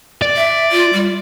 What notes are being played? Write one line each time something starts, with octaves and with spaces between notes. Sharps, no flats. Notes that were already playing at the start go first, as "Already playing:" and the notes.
D5
E5
F4
G3